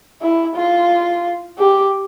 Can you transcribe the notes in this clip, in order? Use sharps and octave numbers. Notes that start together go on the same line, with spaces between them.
E4
F4
G4